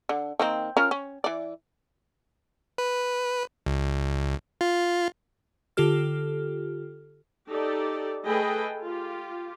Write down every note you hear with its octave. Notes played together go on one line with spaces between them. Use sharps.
D3
D#3 A#3 C4
C#4 F4 A#4
C#4
E3 D5
B4
C#2
F4
D3 F4 G4 A4 F6
D#4 G4 A4 D5
A3 G#4 A4 B4 D#5 G5
F4 G4